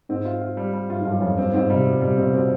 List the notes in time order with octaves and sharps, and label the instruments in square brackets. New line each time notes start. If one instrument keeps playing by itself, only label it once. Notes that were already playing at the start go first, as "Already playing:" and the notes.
[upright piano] G#2 [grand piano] C4
[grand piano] F4
F4
G3
G3
[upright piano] G2 [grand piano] F4
[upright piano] G#2
[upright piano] G2 [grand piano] F4
[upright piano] F#2
[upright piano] F2 [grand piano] F4
[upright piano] G2 [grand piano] C4
[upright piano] G#2 [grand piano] C4
[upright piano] C3 [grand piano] G3
[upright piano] B2 [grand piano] F4
[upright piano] C3 [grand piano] G3
[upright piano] C3 [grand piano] C4
[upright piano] B2 [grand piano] C4